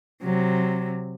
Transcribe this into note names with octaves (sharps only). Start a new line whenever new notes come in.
C3 F#3